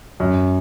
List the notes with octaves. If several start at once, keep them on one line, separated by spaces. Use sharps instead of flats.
F#2